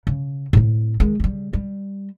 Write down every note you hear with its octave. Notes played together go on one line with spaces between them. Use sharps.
C#3
A2 C4
D#3 G#3
C#3 G3
G3